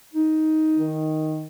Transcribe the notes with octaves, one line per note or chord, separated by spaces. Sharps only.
D#4
D#3